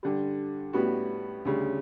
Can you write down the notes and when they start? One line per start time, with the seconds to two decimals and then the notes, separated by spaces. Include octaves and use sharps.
0.03 G2 D3 G3
0.73 A2 G3 B3 F#4
1.45 D2 C#3 G3